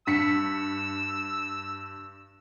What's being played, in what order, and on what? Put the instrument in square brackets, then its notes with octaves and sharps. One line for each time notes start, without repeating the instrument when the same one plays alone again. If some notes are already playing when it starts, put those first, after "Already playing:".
[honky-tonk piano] G2 B6 C#7 [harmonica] E6